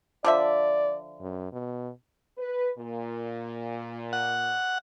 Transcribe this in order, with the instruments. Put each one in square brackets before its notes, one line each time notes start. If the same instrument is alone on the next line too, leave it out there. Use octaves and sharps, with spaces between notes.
[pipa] D3 F3 E5 [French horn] D5
[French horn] F#2
B2
[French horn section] B4
A#2
[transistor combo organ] F#5